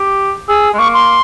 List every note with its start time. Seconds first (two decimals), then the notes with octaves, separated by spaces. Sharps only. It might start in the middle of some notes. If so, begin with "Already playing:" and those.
Already playing: G4
0.48 G#4 E6
0.74 G#3
0.78 A#3 C#6
0.94 C6